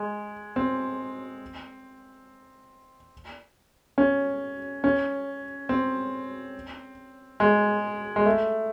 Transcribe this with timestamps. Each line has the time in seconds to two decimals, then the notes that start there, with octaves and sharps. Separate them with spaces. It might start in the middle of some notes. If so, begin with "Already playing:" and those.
Already playing: G#3
0.56 C4
3.98 C#4
4.84 C#4
5.69 C4
7.40 G#3
8.16 G#3
8.26 A3